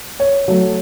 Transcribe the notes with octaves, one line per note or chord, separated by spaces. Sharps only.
C#5
F#3 A3